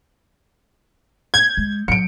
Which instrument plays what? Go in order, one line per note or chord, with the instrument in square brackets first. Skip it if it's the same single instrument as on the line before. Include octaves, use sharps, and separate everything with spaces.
[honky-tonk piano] G6 [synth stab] G#6
[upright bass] G#3
[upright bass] F#3 [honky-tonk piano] C#7 D7